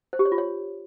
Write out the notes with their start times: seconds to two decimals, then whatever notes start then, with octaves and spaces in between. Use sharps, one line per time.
0.13 C5
0.19 G4
0.25 C#5
0.32 F4
0.38 C#5